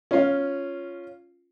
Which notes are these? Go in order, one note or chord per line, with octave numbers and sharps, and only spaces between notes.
C#4 F4